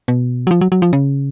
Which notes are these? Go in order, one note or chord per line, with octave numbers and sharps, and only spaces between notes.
B2
F#3
F3
F#3
F#3
F3
C#3